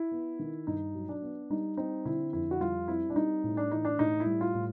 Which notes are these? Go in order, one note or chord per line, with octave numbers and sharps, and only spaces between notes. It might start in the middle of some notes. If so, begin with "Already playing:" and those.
Already playing: E4
B3
D#3
G2 D#4
F#3
D4
B3
G3 D#4
C4 D#4
D3 E4
F2 E4
F#4
G3 F4
C4 E4
D4
G3 D#4
A2
D4
E3 D#4
D4
A2 D#4
E4
G3
F4
A2